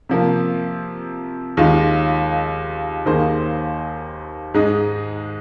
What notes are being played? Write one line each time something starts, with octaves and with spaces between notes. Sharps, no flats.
C3 F3 A#3
D#2 D#3 G#3 F4
D#2 D#3 A#3 G#4 C5
G#2 G#3 D#4